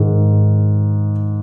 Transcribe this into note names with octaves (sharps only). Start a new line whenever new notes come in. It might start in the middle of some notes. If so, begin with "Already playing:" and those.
Already playing: G#2 D#3 G#3